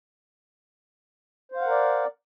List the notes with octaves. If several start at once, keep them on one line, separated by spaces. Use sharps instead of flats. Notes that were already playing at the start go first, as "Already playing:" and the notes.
A#4 C5 D5 F5 F#5